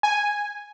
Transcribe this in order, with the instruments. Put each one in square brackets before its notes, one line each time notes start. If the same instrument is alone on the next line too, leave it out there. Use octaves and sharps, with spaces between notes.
[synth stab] G#5